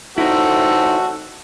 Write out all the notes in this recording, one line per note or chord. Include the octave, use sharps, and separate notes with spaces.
A1 D3 C4 D#4 E4 F#4 A4